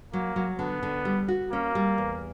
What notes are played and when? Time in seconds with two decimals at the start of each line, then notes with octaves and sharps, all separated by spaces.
0.13 F#3 A#3
0.36 F#3
0.59 D3 B3
0.83 D3
1.05 G3
1.28 F#4
1.52 A#3 C#4
1.75 G3
1.98 E2